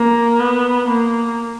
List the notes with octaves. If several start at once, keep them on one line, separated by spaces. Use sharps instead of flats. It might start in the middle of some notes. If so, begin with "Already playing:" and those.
Already playing: A#3
B3
A#3